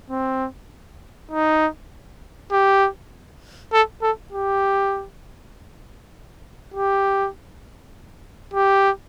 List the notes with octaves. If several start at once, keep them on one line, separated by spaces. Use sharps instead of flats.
C4
D#4
G4
A4
A4
G4
G4
G4